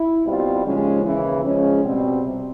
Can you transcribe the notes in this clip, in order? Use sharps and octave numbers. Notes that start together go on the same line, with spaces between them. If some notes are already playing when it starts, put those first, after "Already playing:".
Already playing: E4
B2 G3 C4 F4
D#2 C#3 F3 G#3 C#4
D#2 C#3 E3
C#3 F3 G#3 C#4
B2 G3 C4
C3